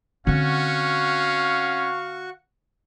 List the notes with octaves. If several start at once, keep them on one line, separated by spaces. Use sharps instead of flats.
D3 C4 C#4 F#4 F5 F#5 C#6